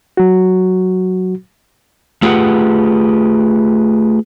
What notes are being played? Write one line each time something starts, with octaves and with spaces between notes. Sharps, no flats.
F#3 F#4
A3 F4 G4 G#4 B4 F#5